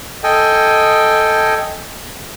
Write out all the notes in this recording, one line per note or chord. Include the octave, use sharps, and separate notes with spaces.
A4 D#5 G5 G#5